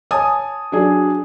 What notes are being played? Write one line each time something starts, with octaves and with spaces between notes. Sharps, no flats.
C#5 G#5 A5 D#6
F#3 D4 G#4